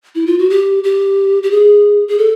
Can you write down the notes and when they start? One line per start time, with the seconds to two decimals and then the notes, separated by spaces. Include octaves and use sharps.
0.15 E4
0.27 F4
0.39 F#4
0.50 G4
0.84 G4
1.43 G4
1.51 G#4
2.08 G#4
2.18 A4